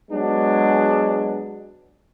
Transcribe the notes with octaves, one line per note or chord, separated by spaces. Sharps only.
F#3 G#3 B3 D4